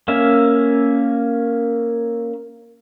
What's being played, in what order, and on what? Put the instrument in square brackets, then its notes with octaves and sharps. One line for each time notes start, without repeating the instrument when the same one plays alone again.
[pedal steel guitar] A#3 C#4 E5